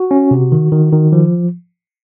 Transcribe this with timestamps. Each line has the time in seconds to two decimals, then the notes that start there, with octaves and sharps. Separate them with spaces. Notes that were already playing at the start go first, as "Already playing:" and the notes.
Already playing: F#4
0.11 C#4
0.31 C3
0.52 D#3
0.72 D#3
0.92 D#3
1.12 F3